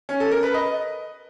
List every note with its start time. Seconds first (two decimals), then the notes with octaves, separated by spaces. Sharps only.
0.09 C#4
0.20 A4
0.32 A#4
0.43 B4
0.54 D#5